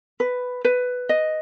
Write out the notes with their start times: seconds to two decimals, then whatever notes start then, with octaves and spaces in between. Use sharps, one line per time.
0.20 B4
0.65 B4
1.09 D#5